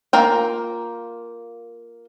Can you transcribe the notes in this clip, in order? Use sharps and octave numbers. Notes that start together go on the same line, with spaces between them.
A#3 F4 A#4 G5